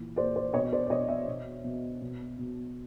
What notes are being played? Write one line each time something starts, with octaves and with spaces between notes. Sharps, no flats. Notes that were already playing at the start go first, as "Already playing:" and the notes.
Already playing: A#2 E3
A#2 C5 D5
C5 D5
B2 C#5 D#5
C5 D5
D5
B2 C#5 D#5
D5 E5
B2
B2
B2
B2